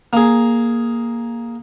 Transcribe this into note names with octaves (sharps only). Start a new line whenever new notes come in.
A#3 G#4